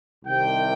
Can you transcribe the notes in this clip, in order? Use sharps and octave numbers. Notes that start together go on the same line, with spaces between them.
C2 C3 D#3 G5